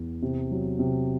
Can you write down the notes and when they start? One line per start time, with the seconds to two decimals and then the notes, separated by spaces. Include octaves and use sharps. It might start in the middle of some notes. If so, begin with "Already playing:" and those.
Already playing: E2
0.22 C3
0.51 F#3
0.79 C3